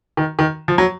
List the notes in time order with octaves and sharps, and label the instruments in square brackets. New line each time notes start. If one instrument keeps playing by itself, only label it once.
[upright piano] D#3
D#3
F3
F#3